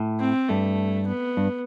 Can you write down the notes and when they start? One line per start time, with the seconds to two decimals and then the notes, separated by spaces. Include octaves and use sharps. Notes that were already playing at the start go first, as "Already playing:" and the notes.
Already playing: A2
0.20 C4
0.49 G2 A3
1.07 B3
1.37 G2